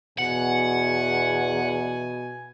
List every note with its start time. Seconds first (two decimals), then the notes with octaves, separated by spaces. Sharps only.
0.18 E2 B2 F#5 G#5